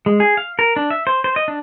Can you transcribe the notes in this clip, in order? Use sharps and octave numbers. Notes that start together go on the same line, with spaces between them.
G#3
G#4
F5
A#4
D4
E5
C5
C5
D#5
D4